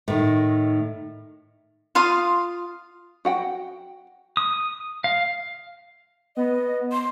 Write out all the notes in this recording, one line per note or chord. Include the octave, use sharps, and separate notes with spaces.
A2 D#3
F4 F5 C6 D#6
F#4 F#5 G5
D#6
F5
B3 D#5
C6